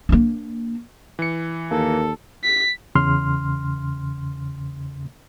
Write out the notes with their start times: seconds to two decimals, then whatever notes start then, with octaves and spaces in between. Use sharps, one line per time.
0.09 A#3 D4
1.19 E3 C#7
1.71 D#2 A#3 A4
2.44 B6
2.95 E2 C#3 C6 F6